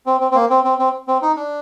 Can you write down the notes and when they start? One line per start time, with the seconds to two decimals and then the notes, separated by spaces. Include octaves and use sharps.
0.06 C4
0.21 C4
0.31 C4
0.35 A#3
0.50 C4
0.64 C4
0.79 C4
1.08 C4
1.22 D#4
1.36 D4